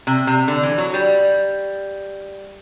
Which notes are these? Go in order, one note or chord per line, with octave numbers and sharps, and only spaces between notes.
C3
C3
D3
E3
F#3
G3